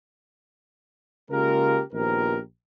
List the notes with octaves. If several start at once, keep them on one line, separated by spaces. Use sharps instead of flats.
C#3 G#3 A#3 F4 G4 A#4
A#1 D#3 F3 B3 G4 A#4